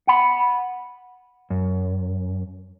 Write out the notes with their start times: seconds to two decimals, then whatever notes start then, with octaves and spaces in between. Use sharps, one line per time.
0.07 F#5 B5
1.50 F#2